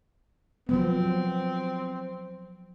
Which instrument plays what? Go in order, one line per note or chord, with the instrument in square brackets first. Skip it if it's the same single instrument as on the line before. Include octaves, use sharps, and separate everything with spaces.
[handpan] F3 F#3 B3 [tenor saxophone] C4